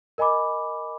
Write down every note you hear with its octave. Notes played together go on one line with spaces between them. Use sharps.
A#4 D#5 G#5 B5 D6